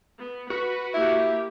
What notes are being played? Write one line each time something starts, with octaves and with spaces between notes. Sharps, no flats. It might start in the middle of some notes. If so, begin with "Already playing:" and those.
B3
F#4 B4
A#3 E4 G4